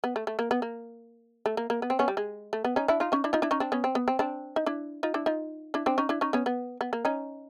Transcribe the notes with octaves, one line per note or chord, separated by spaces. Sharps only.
B3
A3
A3
A#3
B3
A#3
A3
A#3
A#3
B3
C4
B3 C#4
G3
G#3
A3
B3
C#4 D#4
D4 E4
D#4 F4
C#4 D#4
D4 E4
D#4 F4
D4 E4
C#4 D#4
C4 D4
B3 C#4
C4
B3
C4
C4 D4
D#4
D4 E4
D#4 F4
D4 E4
D#4 F4
D4 E4
C4 D4
C#4 D#4
D4 E4
C#4 D#4
B3 C#4
B3
B3
A#3
C#4 D#4